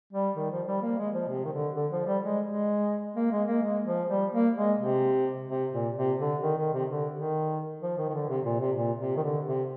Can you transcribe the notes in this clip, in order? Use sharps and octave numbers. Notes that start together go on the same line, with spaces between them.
G3
D#3
F3
G3
A#3
G#3
F3
C3
D#3
D3
D3
F3
G3
G#3
G#3
A#3
G#3
A#3
G#3
F3
G3
A#3
G#3
C3
C3
A#2
C3
D3
D#3
D#3
C3
D3
D#3
F3
D#3
D#3
D3
C3
A#2
C3
A#2
C3
D#3
D3
C3